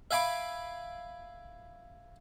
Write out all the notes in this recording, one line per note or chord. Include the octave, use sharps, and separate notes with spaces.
E5 F5 G#5 B5 D6